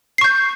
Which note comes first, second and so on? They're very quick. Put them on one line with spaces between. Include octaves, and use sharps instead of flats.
C7 C#6 G6